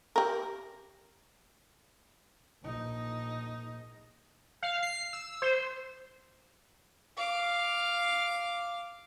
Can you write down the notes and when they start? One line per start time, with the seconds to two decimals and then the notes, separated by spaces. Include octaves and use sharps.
0.16 G4 A#4
2.62 A#1 D#4
4.63 F5
4.83 C7
5.13 E6
5.42 C5
7.17 F5 D6